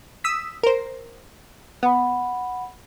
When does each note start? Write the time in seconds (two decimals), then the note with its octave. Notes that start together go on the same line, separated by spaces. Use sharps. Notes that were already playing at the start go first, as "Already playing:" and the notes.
0.24 D#6 E6 B6
0.63 A#4 C5
1.83 B3 F#5 B5